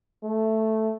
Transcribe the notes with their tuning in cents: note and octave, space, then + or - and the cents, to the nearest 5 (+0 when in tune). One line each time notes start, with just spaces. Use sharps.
A3 +0